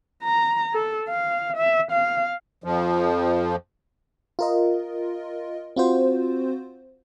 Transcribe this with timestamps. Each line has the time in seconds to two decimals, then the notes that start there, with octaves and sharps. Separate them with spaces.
0.23 A#5
0.74 A4
1.08 F5
1.57 E5
1.91 F5
2.64 F2 F3
4.39 F4 A#4 D#5
5.76 C4 F4 F#4 C5